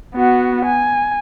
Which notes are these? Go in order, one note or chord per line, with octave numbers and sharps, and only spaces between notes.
B3 F#4
G#5